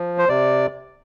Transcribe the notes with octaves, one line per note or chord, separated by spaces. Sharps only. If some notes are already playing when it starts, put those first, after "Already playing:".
Already playing: F3
C5
C3 D5